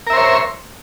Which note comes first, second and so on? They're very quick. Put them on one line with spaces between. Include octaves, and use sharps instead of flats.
A#4 E5 C5 C#5